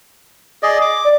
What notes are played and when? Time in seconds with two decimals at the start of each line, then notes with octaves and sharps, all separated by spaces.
0.63 G#4 D5 D#5
0.81 D6
1.05 D5